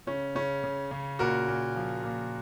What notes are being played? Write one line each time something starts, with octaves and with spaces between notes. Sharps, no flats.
C#3 C#4
C#3 C#4
C#3
C#3
A#2 F#4 A#4
A#2
F3
A#2